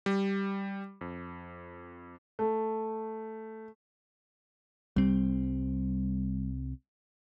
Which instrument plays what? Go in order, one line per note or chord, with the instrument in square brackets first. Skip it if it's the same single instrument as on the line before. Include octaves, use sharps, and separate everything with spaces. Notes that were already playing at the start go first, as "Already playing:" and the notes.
[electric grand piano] G3
F2
[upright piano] A3
[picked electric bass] C2 C4 [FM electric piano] G3